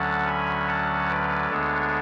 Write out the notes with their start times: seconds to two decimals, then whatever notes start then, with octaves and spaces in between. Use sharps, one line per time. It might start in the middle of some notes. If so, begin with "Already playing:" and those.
Already playing: D2 D3 F#3 C#4 F#5 A5
0.27 G#5 B5
0.68 F#5 A5
1.09 B4 D5
1.50 D2 D3 G#3 B3 D4 A4 C#5